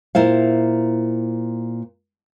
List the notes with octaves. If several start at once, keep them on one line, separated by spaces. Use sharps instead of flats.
A#2 E4 C5 F5